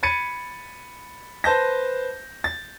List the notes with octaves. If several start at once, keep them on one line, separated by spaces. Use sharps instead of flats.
B5 G#6 A6 C#7 D#7
B4 C5 A5 G6 A#6
A6